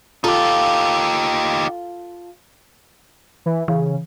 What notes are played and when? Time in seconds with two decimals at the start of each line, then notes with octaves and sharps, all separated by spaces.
0.24 D#4 F4 G4 A4
3.46 E3
3.68 C#3 E3